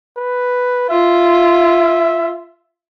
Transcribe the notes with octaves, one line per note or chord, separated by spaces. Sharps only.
B4
F4 E5